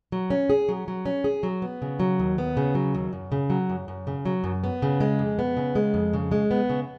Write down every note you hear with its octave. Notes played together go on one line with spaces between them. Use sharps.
F#3
C#4
G#4
F#3
F#3
C#4
G#4
F#3
B3
C#3
F#3
D#2
B3
C#3
F#3
D#2
F#2
C#3
F#3
F#2
F#2
C#3
F#3
F#2
B3
C#3
G#3
F2
B3
C#3
G#3
F2
C#3
G#3
B3
C#3